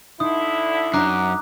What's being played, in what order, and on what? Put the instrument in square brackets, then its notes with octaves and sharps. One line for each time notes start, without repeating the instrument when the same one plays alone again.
[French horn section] D3 E4 [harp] D#4 C6 [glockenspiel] D#6
[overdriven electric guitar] F#2 [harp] D4 D#4 D5 [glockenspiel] A#5 D6 F#6